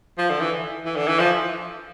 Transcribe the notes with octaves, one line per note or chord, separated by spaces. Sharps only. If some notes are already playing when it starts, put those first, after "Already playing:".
F3
D3
E3
E3
D3
E3
F3